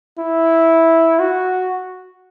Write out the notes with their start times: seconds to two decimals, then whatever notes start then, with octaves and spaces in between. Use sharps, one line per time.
0.18 E4
1.20 F#4